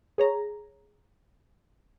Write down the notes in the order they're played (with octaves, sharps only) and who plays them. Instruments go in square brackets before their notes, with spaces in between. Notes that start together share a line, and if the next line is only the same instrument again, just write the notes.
[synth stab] G#4 C#5 A#5